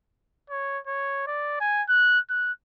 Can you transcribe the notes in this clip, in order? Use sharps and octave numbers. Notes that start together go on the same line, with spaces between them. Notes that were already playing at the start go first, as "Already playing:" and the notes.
C#5
C#5
D5
G#5
F#6
F#6